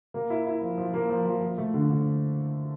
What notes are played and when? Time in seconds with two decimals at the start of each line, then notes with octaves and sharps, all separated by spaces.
0.14 A#3
0.30 E4
0.46 E4
0.61 F3
0.78 F3
0.94 A#3
1.10 F3
1.25 F3
1.42 F3
1.58 A3
1.74 D3
1.90 D3